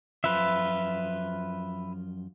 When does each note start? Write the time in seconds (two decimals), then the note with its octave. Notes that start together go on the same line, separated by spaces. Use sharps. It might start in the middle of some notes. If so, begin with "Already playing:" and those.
0.24 F#2 F3 F4 B4 E5